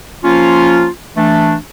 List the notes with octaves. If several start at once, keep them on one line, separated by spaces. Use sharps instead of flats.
F3 A#3 C#4 F4
E3 A3 D4